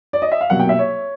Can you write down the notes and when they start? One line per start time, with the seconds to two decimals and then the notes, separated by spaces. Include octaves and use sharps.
0.13 D5
0.22 D#5
0.32 E5
0.41 F5
0.50 C2 B2 F#3 A#3 F#5
0.60 G5
0.69 E5
0.79 C#5